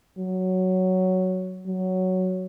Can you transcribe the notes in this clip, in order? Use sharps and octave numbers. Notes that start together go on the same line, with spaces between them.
F#3
F#3